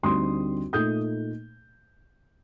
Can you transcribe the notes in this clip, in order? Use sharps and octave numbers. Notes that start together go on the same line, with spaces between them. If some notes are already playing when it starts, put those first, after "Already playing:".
D2 D3 G3 C4 D#4 C6 D#6
A#2 A3 D#4 D#6 G6